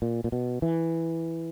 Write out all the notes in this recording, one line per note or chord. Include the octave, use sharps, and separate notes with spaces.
A#2
A#2
B2
E3